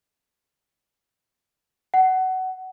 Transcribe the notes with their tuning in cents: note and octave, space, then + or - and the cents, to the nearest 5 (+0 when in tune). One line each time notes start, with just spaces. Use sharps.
F#5 +20